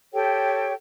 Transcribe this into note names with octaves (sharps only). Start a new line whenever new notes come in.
G4 A4 C#5 G5